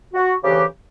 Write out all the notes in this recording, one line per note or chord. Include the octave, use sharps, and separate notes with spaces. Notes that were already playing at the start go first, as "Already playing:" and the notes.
F#4
D2 C#3 E3 G4